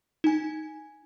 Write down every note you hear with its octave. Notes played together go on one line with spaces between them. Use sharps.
D#4 G#5